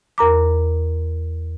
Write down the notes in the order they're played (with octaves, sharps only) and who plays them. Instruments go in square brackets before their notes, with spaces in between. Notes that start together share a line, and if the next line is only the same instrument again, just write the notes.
[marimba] E2 A#4 A#5 D6